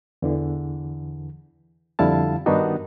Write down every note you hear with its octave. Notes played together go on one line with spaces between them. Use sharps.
E2 D3 E3
F2 D3 G3 E4 F5 A5
G2 D#3 B3 D4 D#4 F#4